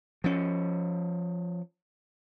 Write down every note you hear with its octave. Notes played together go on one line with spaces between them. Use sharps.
F3 C#4